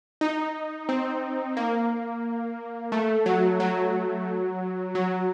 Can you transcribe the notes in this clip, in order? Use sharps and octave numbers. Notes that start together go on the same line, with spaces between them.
D#4
C4
A#3
A3
F#3
F#3
F#3